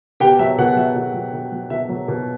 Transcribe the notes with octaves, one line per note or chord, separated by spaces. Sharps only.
B2 G4 G5
F#3 E5
B2 F#5
F#3 E5
B2 F#5
F#3
B2
F#3
B2 E5
F#3
B2